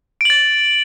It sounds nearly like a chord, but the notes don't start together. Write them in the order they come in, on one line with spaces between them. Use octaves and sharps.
D7 F#7 A6